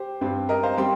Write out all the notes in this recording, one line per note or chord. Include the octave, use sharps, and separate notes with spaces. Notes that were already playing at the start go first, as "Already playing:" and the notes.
Already playing: G4 C5
G2 G3 C4
A#4 D#5
C5 F5
G3 C4 G5 C6